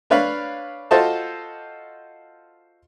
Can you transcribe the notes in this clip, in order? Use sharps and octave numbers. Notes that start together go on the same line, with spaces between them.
D4 B4 C#5 F5 B5
F4 F#4 A4 C5 D#5 A5